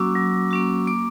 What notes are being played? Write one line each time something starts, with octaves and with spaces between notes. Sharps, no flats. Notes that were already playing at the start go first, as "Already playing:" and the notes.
Already playing: F#3 A#3 C#4 F#4 C#6 D6 E6
F#3
A#3 C#4 F#4
A#3 D6